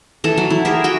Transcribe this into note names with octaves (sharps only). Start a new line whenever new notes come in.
E3 A4
F#3
E4
G4 G#4 A#4 E5
F#4 E5 G5